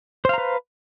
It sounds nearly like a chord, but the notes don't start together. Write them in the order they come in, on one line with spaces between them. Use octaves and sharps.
C5 F5 A#5 B4